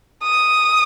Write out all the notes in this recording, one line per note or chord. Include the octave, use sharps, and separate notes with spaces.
D#6